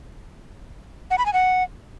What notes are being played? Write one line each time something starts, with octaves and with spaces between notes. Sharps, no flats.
F#5
B5
G#5
F#5